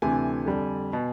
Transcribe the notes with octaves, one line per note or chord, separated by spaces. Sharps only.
D2 C3 E3 A3 G#5
F2 D3 G3
B2